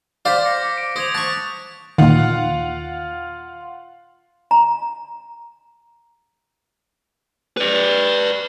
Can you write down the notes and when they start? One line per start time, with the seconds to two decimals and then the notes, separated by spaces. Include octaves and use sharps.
0.25 C5 D5 F5 D6 G6 B6
0.45 A#6 C#7
0.74 B6 D7
0.96 C5 D#6 G#6 F7
1.15 A5 C#6 F#6
1.98 D#2 A#2 D#3 F4 F5 F#5
4.51 A#5
7.57 B4 D5